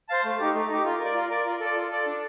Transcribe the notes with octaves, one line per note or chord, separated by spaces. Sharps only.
C5 F5 A5
A3
D#4 G4
A3
D#4 G4
F4
A#4
D5
F4
A#4 D5
F4
A4
D5
F4
A4 D5
D4